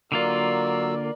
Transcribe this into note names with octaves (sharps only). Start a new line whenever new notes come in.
D3 F#3 A#3 F4 A#4 D5 E6